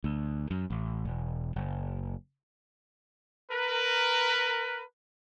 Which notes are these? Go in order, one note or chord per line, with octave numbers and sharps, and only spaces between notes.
D2
F#2
A1
E1
F#1
A#4 B4